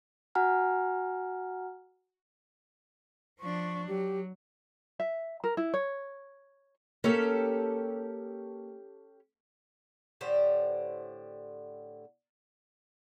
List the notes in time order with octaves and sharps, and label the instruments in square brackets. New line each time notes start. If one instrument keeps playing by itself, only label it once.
[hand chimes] F#4 F#5 G#5 A#5 F6
[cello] F3 D4 [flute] C#6
[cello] F#3 [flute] G4
[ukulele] E5
A#4
E4
C#5
[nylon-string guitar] A#3 [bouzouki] C#4 G4 A4
[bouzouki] A2 D3 G4 C5